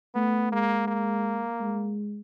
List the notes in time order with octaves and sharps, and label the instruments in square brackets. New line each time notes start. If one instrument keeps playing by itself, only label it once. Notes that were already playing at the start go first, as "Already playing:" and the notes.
[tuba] A3 [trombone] B3
[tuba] G#3 [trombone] A#3
[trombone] A#3
[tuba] G#3